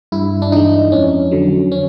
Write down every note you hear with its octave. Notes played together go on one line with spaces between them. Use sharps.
G2 E4
D4
E3 G#3 D#4
F2 C#4
D3 F#3
C#4